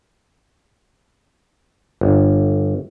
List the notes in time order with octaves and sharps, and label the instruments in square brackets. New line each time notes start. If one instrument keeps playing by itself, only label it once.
[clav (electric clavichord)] G1